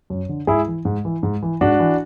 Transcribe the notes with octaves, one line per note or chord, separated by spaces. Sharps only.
F#2
D3
G#2 E4 G#4
E3
G#2
E3
G#2
E3
G#2 D4 F#4
E3